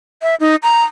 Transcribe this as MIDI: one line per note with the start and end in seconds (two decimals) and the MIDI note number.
0.22 0.35 76
0.40 0.56 63
0.63 0.84 82